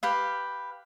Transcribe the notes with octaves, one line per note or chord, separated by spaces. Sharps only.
G4 B4 F5